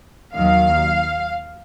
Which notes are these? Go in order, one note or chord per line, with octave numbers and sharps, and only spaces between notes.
D#2 D#3 F#3 F5